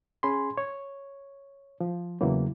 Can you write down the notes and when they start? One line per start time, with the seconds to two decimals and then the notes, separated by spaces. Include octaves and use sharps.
0.23 C#4 G#4 G#5 B5 C6
0.58 C#5
1.80 F3
2.21 E2 C#3 E3 F#3 A#3